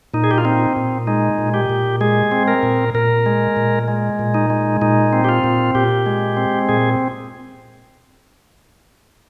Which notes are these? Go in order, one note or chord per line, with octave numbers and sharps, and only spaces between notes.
A#2 D#4
G#4
G4
F4
C4 D#4
A#2
G#3 D#4
A#2
G4
A#2
G#3 G#4
C4
A#4
A#2
A#2 A#4
G#3
A#2
G#3
A#2
D#4
G#3
A#2 D#4
C4
G4
F4
A#2
A#2 G4
G#3
C4
A#2 G#4